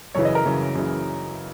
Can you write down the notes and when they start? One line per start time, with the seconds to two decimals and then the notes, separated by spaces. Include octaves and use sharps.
0.15 F#2 C#3 E3 C#5
0.25 D#5
0.35 A#4
0.45 F#2 C#3 E3
0.75 F#2 C#3 E3